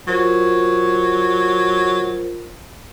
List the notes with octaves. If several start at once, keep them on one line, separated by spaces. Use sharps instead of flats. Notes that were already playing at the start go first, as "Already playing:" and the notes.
F#3 F4 A#4 C5